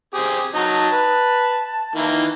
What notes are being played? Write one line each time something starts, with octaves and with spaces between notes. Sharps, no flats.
C4 G4 G#4
F#3 D#4 A5
B4
D#3 E3 A#3 E4